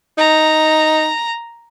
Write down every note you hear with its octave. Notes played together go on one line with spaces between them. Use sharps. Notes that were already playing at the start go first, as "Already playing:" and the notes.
D#4 A#5